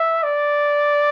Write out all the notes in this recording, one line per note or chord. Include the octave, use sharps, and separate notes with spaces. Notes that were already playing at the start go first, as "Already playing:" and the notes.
Already playing: E5
D5